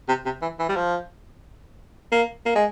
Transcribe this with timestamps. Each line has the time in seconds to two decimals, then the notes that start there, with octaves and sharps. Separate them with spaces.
0.08 C3
0.25 C3
0.42 E3
0.59 E3
0.69 G3
0.76 F3
2.12 A#3
2.46 A#3
2.55 G#3